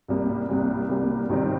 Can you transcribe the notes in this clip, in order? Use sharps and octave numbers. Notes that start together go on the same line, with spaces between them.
C2 C3 G3 A#3
C2 C3 G3 A#3
C2 C3 G3 A#3
C2 C3 D#3 G3 C4